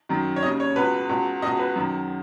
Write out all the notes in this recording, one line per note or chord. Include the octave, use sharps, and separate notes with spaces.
F#2 D#3
C#5
D#2 C#3 D#5
C#5
C#2 B2 B4
C#2 B2
C#2 B2 D#5
B4
F#2 D#3